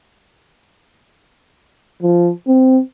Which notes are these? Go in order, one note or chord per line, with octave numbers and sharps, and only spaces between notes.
F3
C4